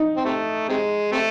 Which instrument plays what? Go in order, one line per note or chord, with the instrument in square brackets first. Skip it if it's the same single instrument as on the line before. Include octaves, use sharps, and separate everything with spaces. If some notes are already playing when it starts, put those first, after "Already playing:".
Already playing: [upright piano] D#4
[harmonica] C4
C3 A3
C3 G#3
C3 A3